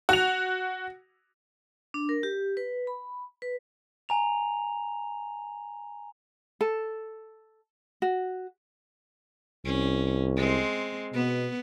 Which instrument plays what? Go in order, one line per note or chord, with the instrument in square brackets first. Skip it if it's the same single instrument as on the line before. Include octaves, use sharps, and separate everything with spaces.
[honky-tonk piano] F#4 F7
[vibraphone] D4
A#4
G4
B4
B5
B4
[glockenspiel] G#5 A#5 F7
[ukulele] A4
F#4
[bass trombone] C2 [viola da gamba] C#4
[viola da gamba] G#3 C4
[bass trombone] B2 [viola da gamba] B3